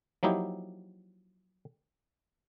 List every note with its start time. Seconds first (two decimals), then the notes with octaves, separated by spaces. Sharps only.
0.23 F3 F#3 A#3 D#4 E4 G4